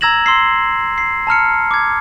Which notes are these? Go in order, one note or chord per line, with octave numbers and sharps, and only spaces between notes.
A#5 E6 G#6 A#6 E7 F#7
C6 E6 C7
C7
A5 A#5 F6 C#7
D6 G#6